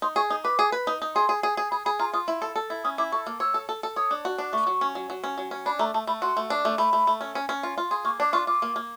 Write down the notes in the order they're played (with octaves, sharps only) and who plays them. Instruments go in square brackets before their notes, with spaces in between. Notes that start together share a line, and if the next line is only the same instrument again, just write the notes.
[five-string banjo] D#4 [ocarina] C6
[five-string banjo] G#4 [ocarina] C#6
[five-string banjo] D#4 [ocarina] D#6
[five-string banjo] B4 [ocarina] D6
[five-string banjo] G#4
B4
D#4
D#4
[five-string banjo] G#4 [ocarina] C6
[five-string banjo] G#4
G#4
G#4
[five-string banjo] G#4 [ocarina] B5
[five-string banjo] G#4 [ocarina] B5
[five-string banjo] F4 [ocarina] A#5
[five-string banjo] F4 [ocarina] D#6
[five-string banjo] E4
A4
A4
E4
[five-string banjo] C#4 [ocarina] D#6
[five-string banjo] E4 [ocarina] D6
[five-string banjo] A4 [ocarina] C#6
[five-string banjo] A#3
[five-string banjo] C#5 [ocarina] E6
[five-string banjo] A4
A4
A4
[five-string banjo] C#5 [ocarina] D#6
[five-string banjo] D4
F#4
D4
[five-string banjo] A3 [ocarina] C#6
[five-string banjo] F#3
C#4
F#3
F#3
C#4
F#3
C#4
[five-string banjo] D4 [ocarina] B5
[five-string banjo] A3 [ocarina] A#5
[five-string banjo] A3 [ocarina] A5
[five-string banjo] A3 [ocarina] B5
[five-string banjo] F#4 [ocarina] C6
[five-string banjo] A3
D4
A3
[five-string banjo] A3 [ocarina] B5
[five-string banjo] A3
A3
C#4
C#4
C#4
F4
F4
[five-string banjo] G#4 [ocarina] C6
[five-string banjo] A#3 [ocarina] C#6
[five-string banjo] D4 [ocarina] D6
[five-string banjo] F4 [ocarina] C#6
[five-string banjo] F4 [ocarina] D6
[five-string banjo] A#3
A#3